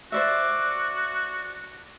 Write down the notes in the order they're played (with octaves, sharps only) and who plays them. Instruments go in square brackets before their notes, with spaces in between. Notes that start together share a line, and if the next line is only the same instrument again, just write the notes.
[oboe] F#4 [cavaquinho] C5 D5 E5